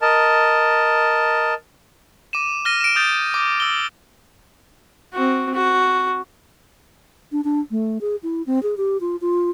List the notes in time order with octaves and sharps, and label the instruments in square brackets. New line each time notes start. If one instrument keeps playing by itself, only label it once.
[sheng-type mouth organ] A#4 D#5 A5
[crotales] D6 D#7 E7
F6 A#6 D#7
D7 E7
D#6 G6 A6
D6
E6 G7
[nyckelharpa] C4 F#4
F#4
[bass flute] D4
D4
A3
G#4
E4
C4
G#4
G4
F4
F4